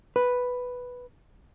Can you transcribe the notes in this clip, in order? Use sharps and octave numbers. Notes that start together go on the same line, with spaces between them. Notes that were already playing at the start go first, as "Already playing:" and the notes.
B4